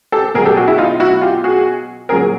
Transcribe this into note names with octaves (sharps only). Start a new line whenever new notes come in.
G4 A4
B2 F#3 G#4 A#4
G4 A4
F#4 G#4
E4
D#4 F4
E4 F#4
F4 G4
F#4 G#4
A#2 F#3 G#4 A#4